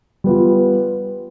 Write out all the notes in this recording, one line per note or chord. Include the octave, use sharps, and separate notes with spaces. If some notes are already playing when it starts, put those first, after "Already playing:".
G3 B3 F4